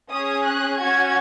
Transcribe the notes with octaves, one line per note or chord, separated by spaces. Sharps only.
C#4 G#4 D#6
F#6
C#4 F#4 G#6